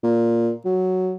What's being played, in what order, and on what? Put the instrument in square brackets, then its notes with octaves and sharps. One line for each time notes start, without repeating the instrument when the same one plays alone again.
[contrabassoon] A#2
F#3